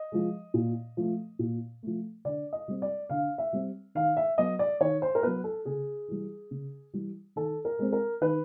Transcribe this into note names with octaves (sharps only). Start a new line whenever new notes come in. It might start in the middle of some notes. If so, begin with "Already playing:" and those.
Already playing: D#5
F3 G#3
A#2
F3 A3
A#2
F3 A3
D3 D5
D#5
G3 C4
D5
D3 F5
E5
G3 C4
D#3 F5
E5
F#3 B3 D#5
D5
D#3 C#5
C5
A#4
F#3 B3 B4
A4
C#3 G#4
E3 G3
C#3
E3 G3
D#3 A4
A#4
G#3 C4
A#4
D#3 B4